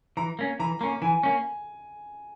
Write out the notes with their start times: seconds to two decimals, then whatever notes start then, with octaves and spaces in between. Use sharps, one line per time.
0.17 E3 A#5
0.39 A#3 C#4
0.59 E3 A#5
0.81 A#3 C#4 A#5
1.02 E3 G#5
1.23 A#3 C#4